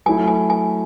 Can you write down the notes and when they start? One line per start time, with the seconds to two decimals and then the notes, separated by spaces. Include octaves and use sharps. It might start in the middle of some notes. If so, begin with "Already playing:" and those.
0.06 F#3 A3 E4 G#5
0.27 G#5
0.50 G#5